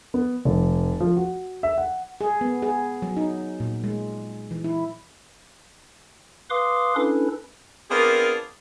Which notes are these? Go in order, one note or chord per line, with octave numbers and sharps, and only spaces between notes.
B3
F1
F3
F#4
E5
F#5
G#4
B3
G#4
F#3
D#4
A#2
G#3
E3
E4
B4 F5 C6 D6 D#6
C#4 D4 E4 A4 B4
B3 C4 D4 F4 G#4 A#4